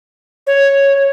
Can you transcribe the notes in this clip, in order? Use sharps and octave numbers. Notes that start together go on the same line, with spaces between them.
C#5